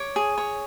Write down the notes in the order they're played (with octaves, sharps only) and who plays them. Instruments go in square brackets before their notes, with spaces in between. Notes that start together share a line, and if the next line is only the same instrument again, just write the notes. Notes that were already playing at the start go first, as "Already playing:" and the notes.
Already playing: [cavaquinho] C#5 D6
G#4
C#5